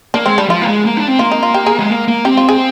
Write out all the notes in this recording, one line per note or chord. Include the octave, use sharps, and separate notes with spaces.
A#3 D4
G#3 C4
G3 D4
F3 F4
A#3
G#3
A#3
D4
C4
A#3 F4
D#4
F4
G4
G#4
G#3
A#3
A#3
C4 G4
F4
G#4